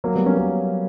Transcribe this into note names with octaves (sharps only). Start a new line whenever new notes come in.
F#3 A#3
G3 B3
A#3 C#4
F#3 A#3